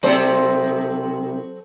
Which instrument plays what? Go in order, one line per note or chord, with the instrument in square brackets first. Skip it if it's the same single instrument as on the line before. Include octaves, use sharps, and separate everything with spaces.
[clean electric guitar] B1 C3 [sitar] F#3 A4 C5